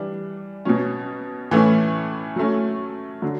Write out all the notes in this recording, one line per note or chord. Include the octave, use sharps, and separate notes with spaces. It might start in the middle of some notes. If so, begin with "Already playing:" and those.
Already playing: E3 G3 D4
B2 F#3 C#4
A2 E3 A3 C#4 E4
F#3 A3 C#4
D3 F#3